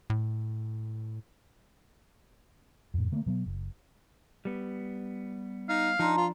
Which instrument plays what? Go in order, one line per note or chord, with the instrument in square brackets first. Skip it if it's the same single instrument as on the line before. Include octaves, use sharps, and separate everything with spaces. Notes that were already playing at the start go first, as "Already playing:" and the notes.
[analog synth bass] A2
[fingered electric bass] F2 A2
D3 A3 A#3
B2 F#3 A#3 B3
F#1
[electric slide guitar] G3 B3
[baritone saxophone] D#4 [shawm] F5
[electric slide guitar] F3 D4 [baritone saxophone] D#4 [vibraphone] A5 A#5 C6
[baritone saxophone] F4